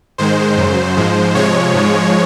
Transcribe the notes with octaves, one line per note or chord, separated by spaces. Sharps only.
G#2 D#3 G#3 C5
F#2 C#3 F#3
G#2 F3 G#3
C3 F3 G#3 C#5
G#2 F3 G#3